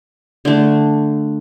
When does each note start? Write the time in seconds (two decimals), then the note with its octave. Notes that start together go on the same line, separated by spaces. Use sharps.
0.45 D3 A3